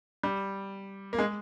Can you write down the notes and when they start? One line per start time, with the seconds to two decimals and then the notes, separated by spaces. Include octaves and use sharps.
0.23 G3
1.13 A#3
1.18 G#3